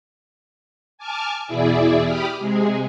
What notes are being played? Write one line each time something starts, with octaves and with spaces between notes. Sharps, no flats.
G#5 A5 D6 F6 G#6
E2 B2 E4 G#4 D5 E5
G4 B5 D6 D#6 F6
C3 G#3 G#4